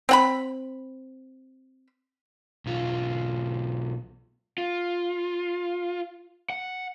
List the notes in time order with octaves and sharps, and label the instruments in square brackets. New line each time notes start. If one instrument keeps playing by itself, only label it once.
[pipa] C4 F#5 B5
[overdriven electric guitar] B1 F4
[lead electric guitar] F4
F#5